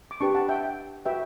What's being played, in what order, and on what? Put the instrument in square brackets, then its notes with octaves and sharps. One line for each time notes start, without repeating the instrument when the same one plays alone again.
[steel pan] D6
D4 G4 B4 A5 C#6
F#5 A5
E5 G5
F#4 B4 E5 G5